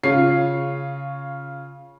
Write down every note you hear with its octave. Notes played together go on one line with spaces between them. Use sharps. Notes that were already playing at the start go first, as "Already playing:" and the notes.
C#3 F4 C#5 C7